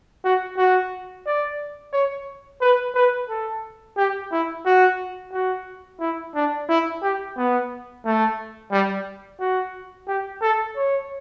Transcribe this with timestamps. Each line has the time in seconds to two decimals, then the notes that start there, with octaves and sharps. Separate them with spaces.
0.24 F#4
0.57 F#4
1.26 D5
1.93 C#5
2.61 B4
2.95 B4
3.29 A4
3.97 G4
4.32 E4
4.66 F#4
5.32 F#4
6.00 E4
6.35 D4
6.69 E4
7.03 G4
7.37 B3
8.05 A3
8.72 G3
9.40 F#4
10.08 G4
10.42 A4
10.76 C#5